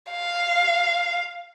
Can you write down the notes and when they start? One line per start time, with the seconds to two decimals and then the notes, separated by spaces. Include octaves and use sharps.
0.11 F5